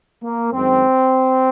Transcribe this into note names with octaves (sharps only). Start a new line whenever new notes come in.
A#3
F#2 D#3 G#3 C4